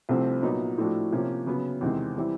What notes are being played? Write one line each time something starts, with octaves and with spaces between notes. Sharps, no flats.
C2 C3 F3 A3 C4
A#2 F#3 B3 D#4
A2 F3 A3 D4 F#4
C3 F3 A#3 C#4
C#3 F#3 B3
E2 C3 D#3 G#3 C4
E3 G3 C4 E4